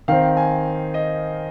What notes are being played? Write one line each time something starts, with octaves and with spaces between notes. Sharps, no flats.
D#3 C4 F5
G#5
D#5